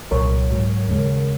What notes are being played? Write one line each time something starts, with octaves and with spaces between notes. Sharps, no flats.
C2 A#2 F#3 A#4 C#5
G#2 F#3
D#2 C#3 G#3